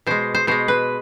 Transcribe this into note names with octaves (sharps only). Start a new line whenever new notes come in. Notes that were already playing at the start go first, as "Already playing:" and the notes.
B2 G#3 C5
C5
B2 G#3 C5
B4